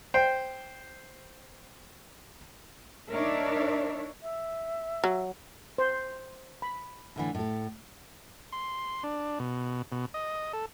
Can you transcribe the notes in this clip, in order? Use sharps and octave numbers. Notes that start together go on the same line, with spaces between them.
C5 G5
D4 D#4 A#4 C#5 D5 E5
E5
F#3
C5
B5
A2 D3 E3
A2 A4
C6
D4
B2
B2
D#5
A4